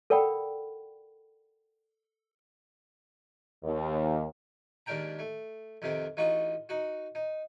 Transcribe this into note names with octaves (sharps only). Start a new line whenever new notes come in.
A4 A#4 D5 F#5 G5 B5
D#2
D#2 G#2 D4 A#4 G5 A#5
A3
F2 C3 D#3 C4
A1 D#4 F4 F#4 D#5 C#6
D#4 F#4
D#4